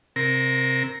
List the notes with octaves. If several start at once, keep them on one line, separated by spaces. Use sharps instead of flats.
C3 A#4